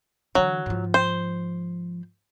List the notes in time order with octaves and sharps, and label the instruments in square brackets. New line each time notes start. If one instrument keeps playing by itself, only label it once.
[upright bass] D3 E3 [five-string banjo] F#3
[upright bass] G#2 F3
[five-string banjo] C5